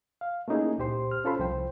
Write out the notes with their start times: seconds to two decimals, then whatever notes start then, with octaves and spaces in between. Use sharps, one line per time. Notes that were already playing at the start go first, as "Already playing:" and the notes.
0.21 F5
0.48 A3 A#3 C#4 D#4 E4 G#4
0.78 C#2 A#2 G4 C5 C6
1.11 F6
1.25 C#4 F4 A4 C5 B5 C6
1.39 C2 F3 C5 G5